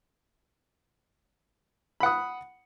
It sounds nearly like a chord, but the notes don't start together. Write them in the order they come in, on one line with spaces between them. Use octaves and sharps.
B5 F#5 D#6